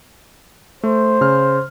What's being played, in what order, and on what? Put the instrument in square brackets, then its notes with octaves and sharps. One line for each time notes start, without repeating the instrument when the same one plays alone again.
[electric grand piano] A3 [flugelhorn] C5
[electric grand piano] C#3 F6